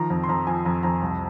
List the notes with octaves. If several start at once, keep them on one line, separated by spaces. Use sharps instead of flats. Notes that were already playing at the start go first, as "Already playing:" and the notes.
Already playing: D#3 F3 A#5
F2
C6
F2 A#5
F3 G#5
F2 A#5
F2 A#5
C2